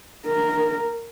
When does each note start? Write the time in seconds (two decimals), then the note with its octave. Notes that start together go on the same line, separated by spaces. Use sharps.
0.26 A#4